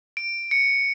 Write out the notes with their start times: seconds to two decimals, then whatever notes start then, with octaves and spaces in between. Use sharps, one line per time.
0.17 D7
0.51 C#7